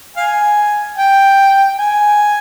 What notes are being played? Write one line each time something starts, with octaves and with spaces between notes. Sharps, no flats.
F5 G#5
G5
G#5